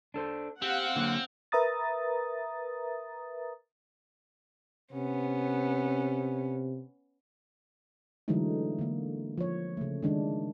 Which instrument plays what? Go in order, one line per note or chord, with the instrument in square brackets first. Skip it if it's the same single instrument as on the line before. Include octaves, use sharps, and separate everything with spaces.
[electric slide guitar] D4 A4 C5
[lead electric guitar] C4 [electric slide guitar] G4 [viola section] F5 F#5
[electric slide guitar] D3 F#3 A#3
[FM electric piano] A#4 B4 E5 A#5 D#6 A6
[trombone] C3 [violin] B3 C#4
[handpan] D3 E3 F#3 G#3 A3 D#4
D3 A#3
F3 C#5
C#3 A3
D#3 G#3 D4